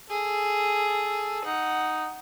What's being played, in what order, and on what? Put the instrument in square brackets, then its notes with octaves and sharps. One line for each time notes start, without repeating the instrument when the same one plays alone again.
[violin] G#4 [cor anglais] A4
[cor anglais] D#4 [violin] F#5